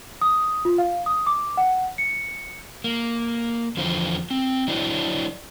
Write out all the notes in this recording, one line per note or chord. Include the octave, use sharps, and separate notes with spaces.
D#6
F4
F5
D#6
D6
F#5
C#7
A#3
E2 D3 F3 F4 C5
C4
F#3 D4 E4 C5